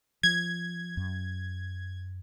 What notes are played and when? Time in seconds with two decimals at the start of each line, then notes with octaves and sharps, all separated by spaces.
0.23 F3 G#6
0.97 F#2